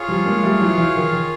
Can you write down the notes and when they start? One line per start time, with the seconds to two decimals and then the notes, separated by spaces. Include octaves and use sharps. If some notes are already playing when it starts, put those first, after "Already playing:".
Already playing: F4 G#4 C#5 F5
0.08 F3 G3
0.25 G#3 A#3
0.43 G3 A3
0.60 E3 F#3
0.78 E3 F#3
0.96 D#3
1.12 D#3